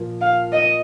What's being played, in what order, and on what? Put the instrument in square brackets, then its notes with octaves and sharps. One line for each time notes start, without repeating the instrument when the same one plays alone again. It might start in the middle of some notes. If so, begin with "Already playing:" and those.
Already playing: [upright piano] A#2 F3 A#3 F4 A#4
[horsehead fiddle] F5
D#5